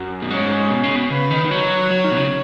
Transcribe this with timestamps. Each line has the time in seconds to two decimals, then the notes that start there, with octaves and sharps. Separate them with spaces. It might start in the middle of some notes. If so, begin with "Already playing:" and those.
Already playing: F#2
0.22 B2
0.30 G#2 C#4
0.71 B2
0.84 C#3
0.96 B2
1.10 C#3 B4
1.31 D#3
1.45 D#3
1.50 F#3 C#5
1.91 F#3
2.05 D#3
2.12 B2
2.17 C#3